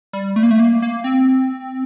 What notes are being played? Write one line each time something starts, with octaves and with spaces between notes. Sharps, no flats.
G3
A3
A#3
A3
A#3
A#3
C4